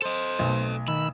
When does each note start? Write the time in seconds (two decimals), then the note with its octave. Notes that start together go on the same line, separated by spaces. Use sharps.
0.02 A4 C5 D#5
0.39 B1 A3
0.88 D#3 B5 E6